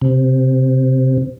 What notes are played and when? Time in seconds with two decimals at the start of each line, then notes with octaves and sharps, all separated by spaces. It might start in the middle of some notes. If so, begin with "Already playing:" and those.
0.02 C3